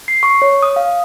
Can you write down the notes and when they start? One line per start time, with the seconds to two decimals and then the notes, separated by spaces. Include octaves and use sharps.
0.08 C7
0.23 C#6
0.42 C#5
0.63 D#6
0.76 F5